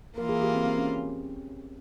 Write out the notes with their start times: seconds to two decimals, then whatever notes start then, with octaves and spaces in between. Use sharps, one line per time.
0.17 E3 A#3 F4 A#4
0.29 G#4
0.43 G4
0.55 C4
0.66 C4
0.79 C#4